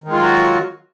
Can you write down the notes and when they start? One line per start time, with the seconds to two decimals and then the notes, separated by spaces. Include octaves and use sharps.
0.04 D#3
0.08 G#3
0.13 F4
0.17 F#3
0.22 F#4